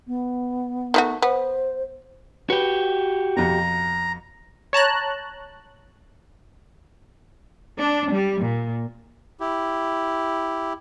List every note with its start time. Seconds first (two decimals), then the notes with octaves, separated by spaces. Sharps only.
0.07 B3
0.94 D#3 A3 F#4
1.22 B3 C5
2.50 F#4 G4 B4
3.36 F2 B2 A#5
4.73 C#5 A5 A#5 F#6
7.77 D4
8.13 G3
8.42 A#2
9.40 E4 G4